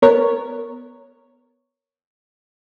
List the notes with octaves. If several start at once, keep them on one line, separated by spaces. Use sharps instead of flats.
B3 A#4 C#5